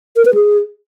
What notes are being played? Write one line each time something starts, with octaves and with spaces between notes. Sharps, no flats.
A#4
B4
G#4